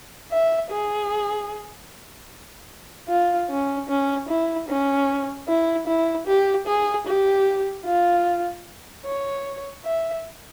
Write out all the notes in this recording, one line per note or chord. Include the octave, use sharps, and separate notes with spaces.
E5
G#4
F4
C#4
C#4
E4
C#4
E4
E4
G4
G#4
G4
F4
C#5
E5